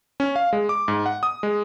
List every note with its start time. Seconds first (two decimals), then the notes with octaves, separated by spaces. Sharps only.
0.20 C#4
0.36 F5
0.53 G#3
0.69 D6
0.88 G#2
1.06 F#5
1.23 D#6
1.43 G#3